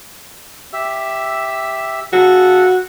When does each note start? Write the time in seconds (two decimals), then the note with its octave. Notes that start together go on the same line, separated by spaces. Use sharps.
0.73 G4 E5 E6
2.13 C#3 F#4 A4